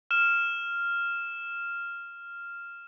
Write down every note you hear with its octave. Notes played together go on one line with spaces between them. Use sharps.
F6 E7